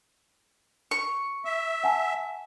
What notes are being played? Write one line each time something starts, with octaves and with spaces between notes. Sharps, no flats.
C#6
E5
F#5 G#5 A5